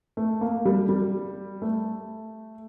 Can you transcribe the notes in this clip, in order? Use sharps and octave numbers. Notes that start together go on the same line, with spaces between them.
A3
A#3
G3
G3
A3